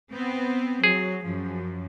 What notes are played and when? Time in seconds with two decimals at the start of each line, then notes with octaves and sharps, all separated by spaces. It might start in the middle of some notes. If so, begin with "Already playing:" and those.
0.12 B3 C4
0.84 F#3 G#4
1.25 F#2 F3